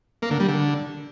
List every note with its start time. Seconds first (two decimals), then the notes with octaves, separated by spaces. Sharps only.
0.22 A#3
0.31 D3
0.40 G3
0.48 D3